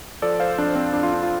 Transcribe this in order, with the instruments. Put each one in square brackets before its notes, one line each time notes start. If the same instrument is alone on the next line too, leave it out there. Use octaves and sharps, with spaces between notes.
[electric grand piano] F3 A4 D5
C5 F5
F2 D4
C4
F2 D4
F4
D4
F4